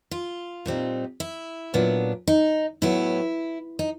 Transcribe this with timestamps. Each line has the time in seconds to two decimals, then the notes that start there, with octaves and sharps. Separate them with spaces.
0.11 F4
0.66 A#2 G3 C4 D#4
1.20 E4
1.74 A#2 F#3 B3 D4
2.28 D#4
2.82 A2 F#3 B3 E4
3.79 D#4